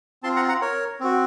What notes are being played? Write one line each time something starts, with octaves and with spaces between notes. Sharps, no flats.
C4 F4 A5 C6
F#5 A#5
F#5 A#5
A#4 C#5
C4 F#4